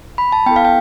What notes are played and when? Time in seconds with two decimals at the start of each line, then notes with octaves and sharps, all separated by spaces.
0.18 B5
0.32 A5
0.46 B3 E4 A4 G5
0.56 F5
0.65 G5